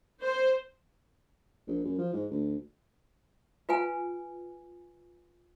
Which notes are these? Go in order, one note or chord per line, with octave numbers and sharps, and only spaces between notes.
C5
A#1
F#2
F3
G#2
D2
F4 B4 F#5 G#5